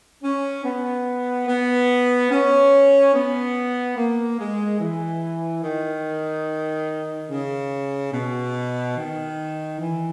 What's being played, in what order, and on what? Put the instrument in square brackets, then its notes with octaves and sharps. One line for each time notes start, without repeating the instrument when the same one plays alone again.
[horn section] C#4
B3
B3
C#4
B3
A#3
G#3
E3
D#3
C#3
B2
D#3
E3